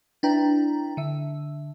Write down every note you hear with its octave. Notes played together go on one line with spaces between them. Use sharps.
D4 E4 B4 G5 A#5
D3 E5